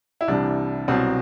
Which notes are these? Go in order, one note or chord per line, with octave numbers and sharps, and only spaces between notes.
E4
C2 C3 E3 G3 D4
C2 B2 F#3 C4